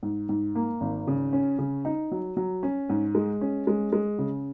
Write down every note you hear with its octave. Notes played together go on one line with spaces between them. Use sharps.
G#2
G#2
A#3
G#1
C#3
C#4
C#3
D#4
F#3
F#3
C#4
G#2
G#3
C#4
G#3
G#3
C#3